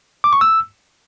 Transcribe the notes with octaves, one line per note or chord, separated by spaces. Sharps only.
D6
C#6
E6